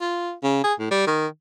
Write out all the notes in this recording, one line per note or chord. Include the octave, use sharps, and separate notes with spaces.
F4
C#3
G#4
A2
G3
D#3